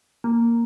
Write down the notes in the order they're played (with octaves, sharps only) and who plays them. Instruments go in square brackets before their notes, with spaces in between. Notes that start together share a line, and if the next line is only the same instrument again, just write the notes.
[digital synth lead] A#3